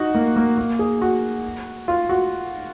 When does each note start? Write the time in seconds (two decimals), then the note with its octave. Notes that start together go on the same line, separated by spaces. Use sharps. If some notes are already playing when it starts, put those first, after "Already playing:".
Already playing: D#4 F#4
0.15 A#3
0.36 A#3
0.58 A#3
0.79 G#4
1.02 F#4
1.88 F4
2.09 F#4